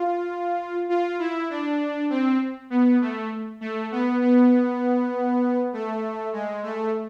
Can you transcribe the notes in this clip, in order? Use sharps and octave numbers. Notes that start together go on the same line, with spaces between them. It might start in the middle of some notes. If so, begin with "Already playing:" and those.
Already playing: F4
F4
E4
D4
C4
B3
A3
A3
B3
B3
A3
G#3
A3